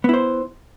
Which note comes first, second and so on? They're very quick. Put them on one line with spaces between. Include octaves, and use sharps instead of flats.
B3 E4 C5